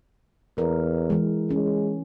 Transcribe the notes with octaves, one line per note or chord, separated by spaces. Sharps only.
E2 A#4
E3 G#3
G#3 C#4